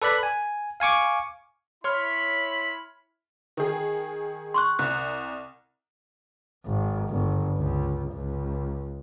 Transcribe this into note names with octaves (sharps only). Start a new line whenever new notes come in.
A4 B4 D5 B5 F#6
G#5
F5 G#5 C#6 D6
E4 C#5 B5 C6 F6
D#3 G#4
C6 C#6 F#6
C2 F#6
G#1
G1
C#2
C#2